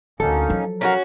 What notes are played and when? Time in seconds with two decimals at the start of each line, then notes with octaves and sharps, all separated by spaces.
0.20 D2 A#3 C#4 D#4 A4
0.50 F3 F#3
0.81 C#4 E4 F#4 A#4 F5 A#5